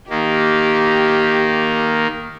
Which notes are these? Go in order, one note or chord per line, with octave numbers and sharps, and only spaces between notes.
D#3 A#3 G4